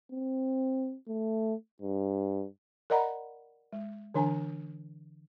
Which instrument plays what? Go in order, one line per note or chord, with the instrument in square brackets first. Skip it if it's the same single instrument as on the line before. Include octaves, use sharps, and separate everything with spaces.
[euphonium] C4
A3
G2
[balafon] A#4 D5 D#5 F#5 A#5 B5
G#3
D3 E3 D4 G#5